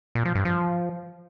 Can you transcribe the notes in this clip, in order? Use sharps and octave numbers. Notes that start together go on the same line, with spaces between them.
A#2
F3
G2
F3